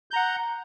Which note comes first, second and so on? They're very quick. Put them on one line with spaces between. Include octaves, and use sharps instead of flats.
G6 A#5 F#5